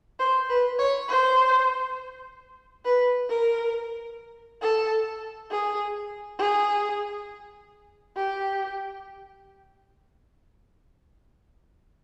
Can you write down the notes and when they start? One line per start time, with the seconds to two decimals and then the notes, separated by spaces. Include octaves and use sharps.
0.19 C5
0.49 B4
0.78 C#5
1.08 C5
2.85 B4
3.29 A#4
4.62 A4
5.51 G#4
6.39 G#4
8.16 G4